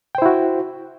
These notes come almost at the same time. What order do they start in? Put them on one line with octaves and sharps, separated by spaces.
G5 C5 E4 F#4